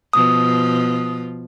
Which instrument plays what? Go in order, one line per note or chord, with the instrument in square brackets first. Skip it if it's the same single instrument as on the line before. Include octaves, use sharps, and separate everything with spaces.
[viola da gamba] B2 F3 [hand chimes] D#6